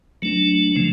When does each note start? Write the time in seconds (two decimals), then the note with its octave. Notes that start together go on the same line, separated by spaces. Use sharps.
0.22 F#3 A3 D4
0.76 C#3 F3 A3